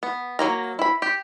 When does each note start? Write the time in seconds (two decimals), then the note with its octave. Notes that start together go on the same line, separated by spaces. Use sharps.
0.03 B3
0.39 F#3 A#3 A#5
0.79 E4 B5
1.02 G4